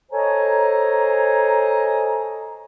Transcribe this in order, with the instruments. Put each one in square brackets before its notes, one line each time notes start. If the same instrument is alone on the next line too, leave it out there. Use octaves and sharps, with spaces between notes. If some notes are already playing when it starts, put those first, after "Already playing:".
[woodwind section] A4 C5 C#5 D#5 G#5 A#5